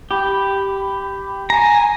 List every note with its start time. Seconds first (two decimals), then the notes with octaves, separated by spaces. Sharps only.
0.11 G4 B5
1.50 G#5 A#5